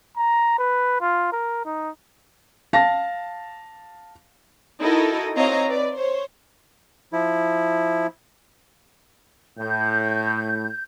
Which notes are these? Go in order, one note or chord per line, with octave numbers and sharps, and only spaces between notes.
A#5
B4
F4
A#4
D#4
F5 A5 A#6
D#4 E4 F#4 A4 A#4 D#5
C4 C5 C#5 D#5 F5 A#5
B4 D5
C5 C#5
F3 E4
A2 G6